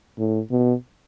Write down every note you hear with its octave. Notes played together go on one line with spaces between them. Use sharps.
A2
B2